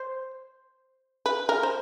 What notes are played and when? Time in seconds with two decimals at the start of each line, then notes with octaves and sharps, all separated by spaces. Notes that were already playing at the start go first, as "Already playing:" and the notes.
Already playing: C5
1.26 B4
1.49 A#4
1.63 C5